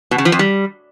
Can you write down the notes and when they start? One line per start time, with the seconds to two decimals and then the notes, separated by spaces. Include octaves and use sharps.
0.11 B2
0.18 C#3
0.25 F3
0.32 F2
0.39 G3